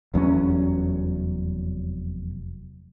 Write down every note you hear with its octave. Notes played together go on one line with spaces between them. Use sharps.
F1 E2 F#3 C#4